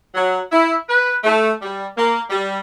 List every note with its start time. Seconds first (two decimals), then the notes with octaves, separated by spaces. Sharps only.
0.15 F#3
0.52 E4
0.89 B4
1.24 A3
1.62 G3
1.97 A#3
2.30 G3